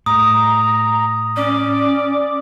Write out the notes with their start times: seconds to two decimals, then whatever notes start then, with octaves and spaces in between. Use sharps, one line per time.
0.06 A2 A#5 D#6
1.36 C#4 D5